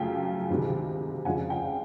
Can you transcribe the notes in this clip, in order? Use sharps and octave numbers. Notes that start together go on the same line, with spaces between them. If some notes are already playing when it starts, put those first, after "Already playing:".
Already playing: F#2 C#3 F3 A3 F5 G5
D2 C3 D#3 G#3
F2 C#3 F3 G#3 F#5 G#5
F5 G5